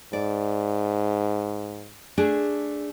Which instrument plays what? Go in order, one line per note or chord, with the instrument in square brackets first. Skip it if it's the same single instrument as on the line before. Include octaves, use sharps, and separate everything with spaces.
[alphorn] G#2 [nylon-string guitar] D5
[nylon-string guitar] A3 D4 G#4